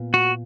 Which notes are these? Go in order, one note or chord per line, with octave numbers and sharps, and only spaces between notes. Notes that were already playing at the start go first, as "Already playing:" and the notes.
Already playing: A#2 B3
F#4